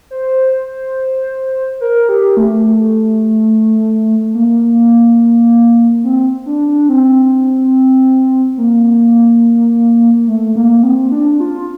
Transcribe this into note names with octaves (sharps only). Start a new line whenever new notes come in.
C5
A#4
G4
A3
A#3
C4
D4
D4
C4
A#3
A3
A#3
C4
D4
F4